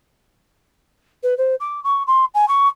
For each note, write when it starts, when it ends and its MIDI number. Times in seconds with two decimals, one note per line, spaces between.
1.23 1.37 71
1.37 1.55 72
1.60 1.80 86
1.84 2.03 85
2.07 2.25 84
2.34 2.48 80
2.48 2.68 85